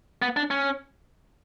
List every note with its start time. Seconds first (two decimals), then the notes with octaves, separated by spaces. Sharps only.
0.22 B3
0.37 D4
0.51 C#4